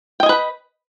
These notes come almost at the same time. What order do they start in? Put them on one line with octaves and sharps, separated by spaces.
G5 D#5 G#5 B4 B5